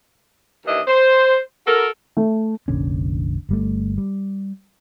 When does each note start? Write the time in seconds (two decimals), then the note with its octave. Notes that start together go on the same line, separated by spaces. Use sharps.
0.66 D#2 E3 D4 E4 D#5
0.88 C5
1.66 F#4 A4 A#4
2.17 A3
2.68 F1 A#1 D3 C#4
3.49 G1 G3 A3
3.98 G3